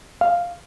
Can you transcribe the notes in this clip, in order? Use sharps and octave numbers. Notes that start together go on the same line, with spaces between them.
F5